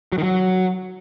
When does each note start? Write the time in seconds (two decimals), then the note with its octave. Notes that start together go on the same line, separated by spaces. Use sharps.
0.12 F#3
0.18 D#3
0.23 F#3